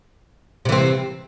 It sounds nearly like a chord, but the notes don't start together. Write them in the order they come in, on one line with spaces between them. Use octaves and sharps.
C3 E3 C4